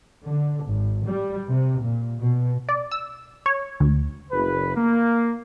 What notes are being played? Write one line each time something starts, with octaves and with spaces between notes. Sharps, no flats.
D3
G#1
G3
C3
A#2
B2
D5
E6
C#5
D2
F#1 B4
A#3